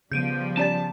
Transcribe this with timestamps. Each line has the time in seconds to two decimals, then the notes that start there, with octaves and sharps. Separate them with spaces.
0.12 C#3 F3 G3 B3 G6 D7 D#7
0.57 C#4 D5 A5 A6